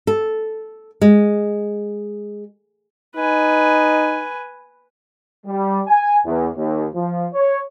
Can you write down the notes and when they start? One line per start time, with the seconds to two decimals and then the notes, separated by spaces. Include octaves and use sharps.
0.07 A4
1.01 G#3
3.16 D#4 B4 G#5
5.47 G3
5.87 G#5
6.26 E2
6.56 D#2
6.95 F3
7.34 C#5